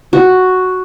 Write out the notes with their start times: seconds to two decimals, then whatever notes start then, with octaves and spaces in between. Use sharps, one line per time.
0.13 F#4